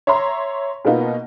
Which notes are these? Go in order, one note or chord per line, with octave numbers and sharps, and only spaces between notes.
C#5 E5 A#5 C6
B2 A#3 B3 D#4 F4